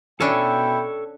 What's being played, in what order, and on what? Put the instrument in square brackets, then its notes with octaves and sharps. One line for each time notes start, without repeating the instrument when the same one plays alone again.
[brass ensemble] B2 G5 [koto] C#4 D4 [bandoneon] E4 [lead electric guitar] A4 C#5